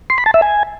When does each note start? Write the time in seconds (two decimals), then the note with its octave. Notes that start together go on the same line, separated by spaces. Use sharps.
0.10 C6
0.18 B5
0.26 A5
0.34 E5
0.42 G#5